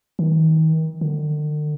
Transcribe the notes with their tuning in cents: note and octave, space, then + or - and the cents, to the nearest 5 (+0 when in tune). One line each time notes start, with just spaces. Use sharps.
D#3 +35
D3 +40